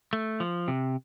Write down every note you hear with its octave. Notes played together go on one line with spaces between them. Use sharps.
A3
F3
C3